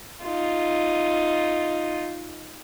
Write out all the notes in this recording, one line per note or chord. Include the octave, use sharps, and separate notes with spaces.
D#4 F4